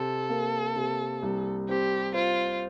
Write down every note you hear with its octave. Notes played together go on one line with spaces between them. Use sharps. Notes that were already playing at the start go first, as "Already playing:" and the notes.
Already playing: C3 A4
A#3
C3
C2
C4 G4
F4 C5